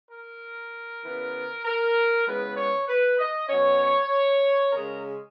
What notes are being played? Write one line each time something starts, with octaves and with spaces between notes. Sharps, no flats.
A#4
C#3 E3 B3
A#4
C#3 E3 G#3 B3 B4
C#5
B4
D#5
B2 F#3 C#4 C#5
C#3 G#3 C#4 A#4